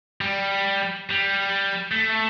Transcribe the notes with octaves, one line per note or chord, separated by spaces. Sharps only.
G3
G3
A3